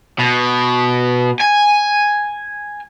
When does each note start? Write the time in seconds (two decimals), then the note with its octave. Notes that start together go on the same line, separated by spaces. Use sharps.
0.19 B2
1.40 G#5